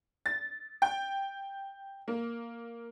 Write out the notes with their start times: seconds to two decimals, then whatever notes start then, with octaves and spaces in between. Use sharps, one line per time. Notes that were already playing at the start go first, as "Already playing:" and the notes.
0.26 A6
0.82 G5
2.08 A#3